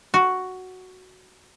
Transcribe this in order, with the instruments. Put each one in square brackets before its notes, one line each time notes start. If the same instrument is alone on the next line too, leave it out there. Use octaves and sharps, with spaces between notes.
[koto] F#4